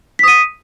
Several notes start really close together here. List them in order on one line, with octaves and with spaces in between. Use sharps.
B6 D#6 D#7